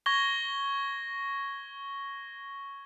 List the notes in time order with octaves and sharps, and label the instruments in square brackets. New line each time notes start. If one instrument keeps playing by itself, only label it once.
[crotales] C#6 G#6 A#6 G7